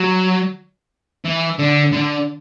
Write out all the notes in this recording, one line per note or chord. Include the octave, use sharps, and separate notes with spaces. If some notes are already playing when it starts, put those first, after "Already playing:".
Already playing: F#3
E3
D3
D3